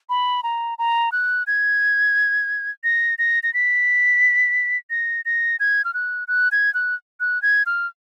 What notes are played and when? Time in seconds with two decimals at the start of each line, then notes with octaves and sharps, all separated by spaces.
0.09 B5
0.43 A#5
0.79 A#5
1.12 F#6
1.47 G#6
2.84 A#6
3.19 A#6
3.43 A#6
3.54 B6
4.90 A#6
5.25 A#6
5.60 G#6
5.85 F6
5.94 F#6
6.28 F#6
6.52 G#6
6.74 F#6
7.20 F#6
7.42 G#6
7.66 F6